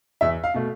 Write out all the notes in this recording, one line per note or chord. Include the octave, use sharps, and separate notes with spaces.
E2 E5
F5
B2 A3